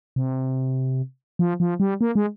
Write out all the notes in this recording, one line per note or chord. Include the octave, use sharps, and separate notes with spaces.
C3
F3
F3
G3
A#3
G#3